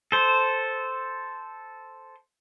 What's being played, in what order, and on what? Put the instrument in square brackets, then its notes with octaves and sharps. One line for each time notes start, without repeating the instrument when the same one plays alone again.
[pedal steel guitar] A4 C5